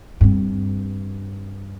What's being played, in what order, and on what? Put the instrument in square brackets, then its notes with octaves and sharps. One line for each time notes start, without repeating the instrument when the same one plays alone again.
[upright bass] G2 C4